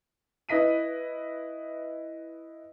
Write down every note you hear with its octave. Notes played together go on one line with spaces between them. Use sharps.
E4 B4 D#5 B6 D#7